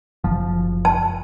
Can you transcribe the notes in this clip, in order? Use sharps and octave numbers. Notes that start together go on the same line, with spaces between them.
F#1 F3
A5